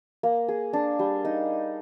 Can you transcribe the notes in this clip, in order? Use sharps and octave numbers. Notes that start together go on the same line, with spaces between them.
A#3
G#4
D4
G3
D#4